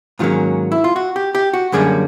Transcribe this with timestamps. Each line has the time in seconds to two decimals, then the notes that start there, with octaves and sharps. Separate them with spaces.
0.19 G#2 D#3 F#3 A#3 C#4 F4
0.72 E4
0.84 F4
0.96 F#4
1.16 G4
1.35 G4
1.53 F#4
1.72 F#2 D3 G3 A#3 C#4 G#4